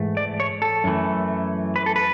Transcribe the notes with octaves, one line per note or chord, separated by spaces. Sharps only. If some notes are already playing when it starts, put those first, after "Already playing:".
Already playing: G#2 E3 A3
D5
C#5
A4
F#2 E3 A3
B4
A4
B4